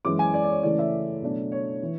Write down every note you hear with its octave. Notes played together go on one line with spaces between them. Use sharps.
F#2 E3 G#3 D6
G#5
D5
D5
C#5
C#3 E3 A3 C#4 E4 D5
E5
B2 F#3 A3 D4
C#5
E3